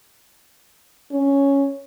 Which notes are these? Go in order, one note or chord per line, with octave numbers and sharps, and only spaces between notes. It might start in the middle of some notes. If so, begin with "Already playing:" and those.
C#4